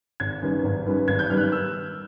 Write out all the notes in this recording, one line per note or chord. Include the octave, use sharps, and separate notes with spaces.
G#1 G#6
F#2 D#3 G3 B3
G#1
F#2 D#3 G3 B3
G#1 G#6
G6
F#2 D#3 G3 B3 F6
F#6
F6
E6